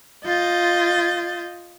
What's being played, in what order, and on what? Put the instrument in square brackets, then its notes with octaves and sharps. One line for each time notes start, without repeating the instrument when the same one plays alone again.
[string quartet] F4 D#5 G6 A6